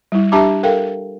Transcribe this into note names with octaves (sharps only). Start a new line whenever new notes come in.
G3 E4
D4 G4 E5 A5 A#5 D6
A4 A#4 F5 G5